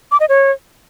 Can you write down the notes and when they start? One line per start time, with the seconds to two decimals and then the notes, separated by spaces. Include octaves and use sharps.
0.12 D6
0.20 D#5
0.29 C#5